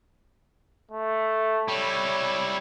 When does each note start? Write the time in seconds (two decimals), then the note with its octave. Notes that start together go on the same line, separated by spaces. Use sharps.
0.91 A3
1.68 G3 E4 C#5